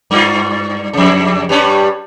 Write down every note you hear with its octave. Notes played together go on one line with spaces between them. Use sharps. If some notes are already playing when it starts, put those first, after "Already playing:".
G2 F4
F2 C#3
G2 G3 C#4